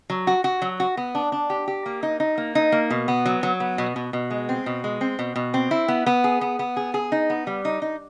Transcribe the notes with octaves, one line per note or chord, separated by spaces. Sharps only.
F#3
F#4
F#4
F#3
F#4
B3
D4
D4
G4
G4
A#3
D#4
D#4
A#3
D#4
A#3
B2
B3
F#3
F#3
B3
B2
B2
B2
G#3
C4
B2
G#3
C4
B2
B2
C4
E4
B3
B3
G#4
B3
B3
G#4
G#4
D#4
B3
G3
D#4
D#4